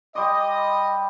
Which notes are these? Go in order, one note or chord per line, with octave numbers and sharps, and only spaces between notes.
G3 C5 D#5 D6